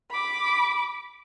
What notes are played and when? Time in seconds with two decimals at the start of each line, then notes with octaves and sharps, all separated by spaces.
0.11 B5 D6